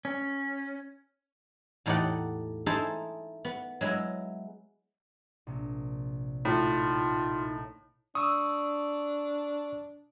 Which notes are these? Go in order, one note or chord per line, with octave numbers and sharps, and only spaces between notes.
C#4
E2 A2 D#4 G4 D5 F#5
D#4 E4 G#4 A4 C5
B3
F#3 G#3 E4
A#1 C3
A2 D#4 F4
D4 C#6 D#6 E6